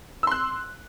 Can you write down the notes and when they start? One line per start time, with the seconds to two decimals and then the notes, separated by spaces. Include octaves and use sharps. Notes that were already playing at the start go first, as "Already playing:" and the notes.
0.23 E6
0.27 C6
0.32 F#6